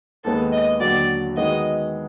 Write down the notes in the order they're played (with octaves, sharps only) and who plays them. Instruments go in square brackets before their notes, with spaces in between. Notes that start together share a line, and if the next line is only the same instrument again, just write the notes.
[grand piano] D#2 D#3 G#3 B3 [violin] A4
[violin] D#5
[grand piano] D#2 D3 F#3 [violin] D5
[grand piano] D#3 G#3 B3 D#4 F#4 [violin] D#5